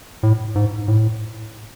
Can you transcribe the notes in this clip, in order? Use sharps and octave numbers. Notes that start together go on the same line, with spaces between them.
A2
G#2
A2